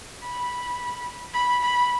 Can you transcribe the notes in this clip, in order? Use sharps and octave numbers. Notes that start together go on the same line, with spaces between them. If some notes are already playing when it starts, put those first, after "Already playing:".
B5
B5
B5